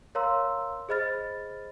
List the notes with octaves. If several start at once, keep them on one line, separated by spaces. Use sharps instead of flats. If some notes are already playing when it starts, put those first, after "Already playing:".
A#4 C#5 F5 A#5 C6 E6
G#4 C5 D#5 B5 F6 A6